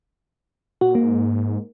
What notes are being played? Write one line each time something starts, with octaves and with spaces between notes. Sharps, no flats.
A#2 F#4
G#2 A#3